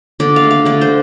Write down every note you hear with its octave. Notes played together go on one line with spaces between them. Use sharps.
D3 D5
F5
A3
F5
D3 D5
C5